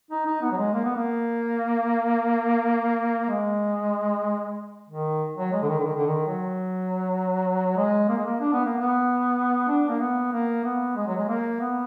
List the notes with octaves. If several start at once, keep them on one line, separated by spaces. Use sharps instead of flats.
D#4
D#4
B3
F#3
G#3
A#3
B3
A#3
G#3
D#3
F#3
G#3
D3
D#3
D3
D#3
D3
D#3
F#3
G#3
A#3
G#3
A#3
D4
B3
A#3
B3
D4
A#3
B3
A#3
B3
G#3
F#3
G#3
A#3
B3